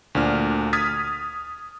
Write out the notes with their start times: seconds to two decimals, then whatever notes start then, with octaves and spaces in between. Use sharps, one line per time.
0.15 D2 A#2 D4 F6
0.73 D#6 F6 G#6 A6 B6